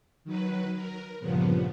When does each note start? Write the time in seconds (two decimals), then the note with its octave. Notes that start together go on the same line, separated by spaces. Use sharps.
0.24 D#3 F#3 B4
0.76 A#4
1.20 G2 A#2 C#3 F3 B3